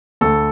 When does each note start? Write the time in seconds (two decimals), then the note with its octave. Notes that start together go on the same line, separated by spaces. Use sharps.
0.21 D2 A4